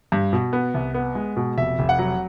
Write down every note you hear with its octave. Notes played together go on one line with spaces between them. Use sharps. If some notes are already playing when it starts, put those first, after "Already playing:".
G2
B2
B3
C2
B3
G#3
B2
F1 E5
F1
F#5
F#3